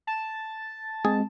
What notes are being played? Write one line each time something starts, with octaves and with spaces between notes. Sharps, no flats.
A5
G#3 C4 G#4